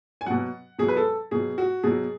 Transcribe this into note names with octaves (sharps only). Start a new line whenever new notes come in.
G#5
B2 F#3 F#5
B2 F#3 G#4
B4
A4
B2 F#3 G#4
F#4
B2 F#3 G#4